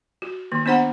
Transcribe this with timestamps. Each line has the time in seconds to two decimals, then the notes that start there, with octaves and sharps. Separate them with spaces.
0.22 F#4
0.52 D#3 A#3
0.66 B3 D4 C5 F#5 A#5